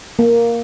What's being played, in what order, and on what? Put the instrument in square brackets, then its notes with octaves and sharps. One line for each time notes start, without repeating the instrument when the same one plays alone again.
[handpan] A#3